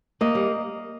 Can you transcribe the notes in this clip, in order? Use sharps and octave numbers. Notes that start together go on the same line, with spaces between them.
A#3 D#5
G3